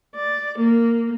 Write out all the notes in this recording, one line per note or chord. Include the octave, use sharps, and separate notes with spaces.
D5
A#3